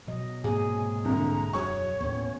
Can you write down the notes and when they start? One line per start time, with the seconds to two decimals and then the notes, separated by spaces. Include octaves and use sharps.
0.07 B2 F#3 D#5
0.44 G#2 C3 A#3 G#4 G#5
1.05 C2 D3 A#5
1.53 E1 F#2 F#3 C#5 C#6
2.01 D#2 A2 B3 C#4